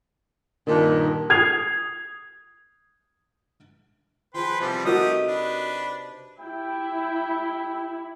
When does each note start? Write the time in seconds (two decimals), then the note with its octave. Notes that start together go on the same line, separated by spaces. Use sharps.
0.67 G2 A#2 D#3
1.30 D#6 G#6 C7 F7
4.34 F3 G#4 B4 G5 C6
4.61 C3 E3 F3 G3 A5
4.85 A3 D#4 F#4 G4 A#4 E5 D#6
5.28 D4 B4
6.40 E4 G4 G5